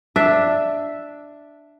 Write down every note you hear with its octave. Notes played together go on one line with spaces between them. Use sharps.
D4 E5